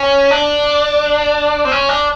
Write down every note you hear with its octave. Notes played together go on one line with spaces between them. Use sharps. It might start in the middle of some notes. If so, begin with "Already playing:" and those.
Already playing: C#4
D4
C4
C#4
D4